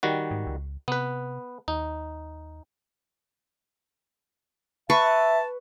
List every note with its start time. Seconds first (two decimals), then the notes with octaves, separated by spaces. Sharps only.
0.03 D#3 G3 F#4
0.31 G#2
0.47 C#2
0.88 C3 B3 B4
1.68 D#2 D#4
4.90 B4 E5 A5 C#6